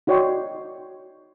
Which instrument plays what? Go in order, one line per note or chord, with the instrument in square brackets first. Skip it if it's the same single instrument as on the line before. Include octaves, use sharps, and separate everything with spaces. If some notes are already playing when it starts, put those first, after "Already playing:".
[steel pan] D#4 F#4 C#5 D5 G5 C6